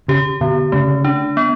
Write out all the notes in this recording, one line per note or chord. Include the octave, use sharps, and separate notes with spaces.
C#3 G4
B2 D3
C#3 A3
D4
B3